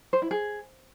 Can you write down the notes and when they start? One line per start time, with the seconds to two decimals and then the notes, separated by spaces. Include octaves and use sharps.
0.13 C5
0.22 E4
0.31 G#4